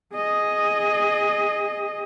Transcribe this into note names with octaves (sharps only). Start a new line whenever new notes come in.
G#4 D#5